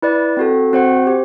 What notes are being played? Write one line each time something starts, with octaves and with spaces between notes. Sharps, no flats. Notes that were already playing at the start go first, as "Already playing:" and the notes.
E4 B4 D5
C4 F#4 A4
C4 F#4 C5 F#5
G4 C5